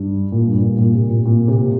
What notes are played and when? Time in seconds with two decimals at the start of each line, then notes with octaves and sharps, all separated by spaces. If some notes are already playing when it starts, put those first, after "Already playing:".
Already playing: G2
0.32 A#2
0.47 G2
0.55 A#2
0.69 G2
0.79 A#2
0.94 C3
1.10 A#2
1.26 A#2
1.48 C3